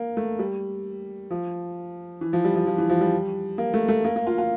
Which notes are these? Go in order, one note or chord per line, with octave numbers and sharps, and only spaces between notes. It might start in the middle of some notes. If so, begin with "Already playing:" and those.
Already playing: A#3
A3
G3
F3
E3
F3
G3
F3
F3
E3
F3
G3
A#3
A3
A3
A#3
A#3
F4
F4